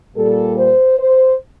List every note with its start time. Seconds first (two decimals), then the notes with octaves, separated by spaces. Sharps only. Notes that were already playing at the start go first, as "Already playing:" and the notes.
0.15 A#2 G3 A4
0.57 C5
0.98 C5